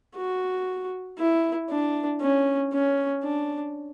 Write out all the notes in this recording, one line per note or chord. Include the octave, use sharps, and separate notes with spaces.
F#4
E4
D4
C#4
C#4
D4